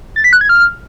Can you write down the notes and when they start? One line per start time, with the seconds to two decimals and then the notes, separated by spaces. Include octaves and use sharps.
0.16 A6
0.24 B6
0.33 F#6
0.41 G#6
0.49 F6